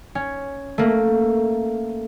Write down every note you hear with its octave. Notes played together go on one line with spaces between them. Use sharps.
C#4
A3 A#3